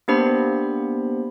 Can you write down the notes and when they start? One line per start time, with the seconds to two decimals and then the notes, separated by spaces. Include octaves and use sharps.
0.08 A#3 B3 D4 G4 C5 B5